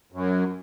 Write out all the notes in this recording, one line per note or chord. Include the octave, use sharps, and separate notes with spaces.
F#2